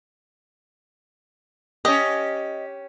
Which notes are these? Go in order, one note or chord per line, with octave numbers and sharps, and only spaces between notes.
C#4 G4 D#5